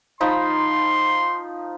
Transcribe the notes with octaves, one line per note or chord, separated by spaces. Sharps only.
F3 D#4 B5 C6